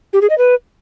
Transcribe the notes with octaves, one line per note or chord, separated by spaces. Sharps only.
G4
G#4
D#5
B4